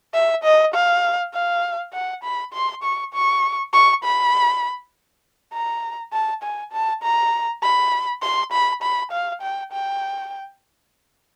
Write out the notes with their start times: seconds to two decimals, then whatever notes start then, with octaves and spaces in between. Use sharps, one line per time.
0.14 E5
0.44 D#5
0.74 F5
1.33 F5
1.93 F#5
2.23 B5
2.54 C6
2.83 C#6
3.14 C#6
3.73 C#6
4.04 B5
5.53 A#5
6.13 A5
6.43 G#5
6.72 A5
7.03 A#5
7.63 B5
8.22 C6
8.52 B5
8.82 B5
9.12 F5
9.42 G5
9.72 G5